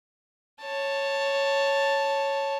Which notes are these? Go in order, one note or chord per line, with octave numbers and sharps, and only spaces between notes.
C#5 A5